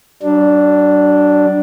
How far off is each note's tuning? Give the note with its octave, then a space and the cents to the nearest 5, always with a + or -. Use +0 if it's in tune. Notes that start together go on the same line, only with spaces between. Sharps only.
F#3 +40 D4 +0